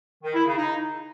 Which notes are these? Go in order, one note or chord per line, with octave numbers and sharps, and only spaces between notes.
D#3
E4
C#3
D#4